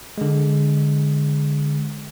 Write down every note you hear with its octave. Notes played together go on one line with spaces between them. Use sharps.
D3 G#3